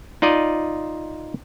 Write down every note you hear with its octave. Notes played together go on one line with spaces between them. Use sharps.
D#4 F4 D5 D#5